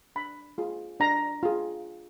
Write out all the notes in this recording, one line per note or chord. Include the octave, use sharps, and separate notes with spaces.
D4 B5
F4 G#4
D4 A#5
F4 G#4